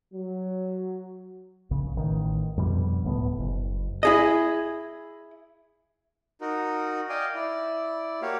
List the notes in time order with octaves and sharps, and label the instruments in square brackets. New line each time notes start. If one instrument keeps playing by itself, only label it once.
[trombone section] F#3
[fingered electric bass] A#1 C#3
A1 D#3
F2 B2 D3 G3
D1 C#2 A2 B3
F#1
[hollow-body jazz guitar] E4 G#4 D#5
[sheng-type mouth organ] D#4 F#4 A#4
D5 D#5 F5 G5 G#5
E4 D5
A#3 F#4 G4 C#5 F5